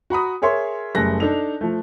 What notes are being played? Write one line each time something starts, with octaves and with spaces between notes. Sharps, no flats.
F#4 A#5 B5 D#6
G#4 A#4 C#5 E5 C6
F#1 G3 A3 G#4 F#6 A#6
D4 D#4 A4 F7
F3 A3